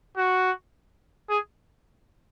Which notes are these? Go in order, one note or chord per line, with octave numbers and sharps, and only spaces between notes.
F#4
G#4